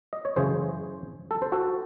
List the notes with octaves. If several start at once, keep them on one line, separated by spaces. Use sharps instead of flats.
D#5
C#5
F#2 C#3 E3 A3 G#4 C5
A4
C5
F#4 A4